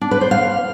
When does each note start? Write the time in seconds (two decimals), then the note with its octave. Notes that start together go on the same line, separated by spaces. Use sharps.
0.01 D4
0.11 B4
0.21 C5
0.31 F5